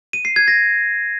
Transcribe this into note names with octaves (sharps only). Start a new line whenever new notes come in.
D#7
C7
G#6
A#6